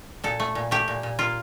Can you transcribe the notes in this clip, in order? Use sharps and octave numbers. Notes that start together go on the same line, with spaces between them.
A#2 A4
A3
A#2
A3 G4
A#2
A#2
A#3 F4